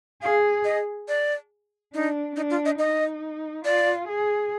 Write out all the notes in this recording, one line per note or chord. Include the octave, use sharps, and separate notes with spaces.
G#4 F5
D#5
D5
D4 D#4
D4 D#4
F4
D#5
D#4 D#5
F4 D5
G#4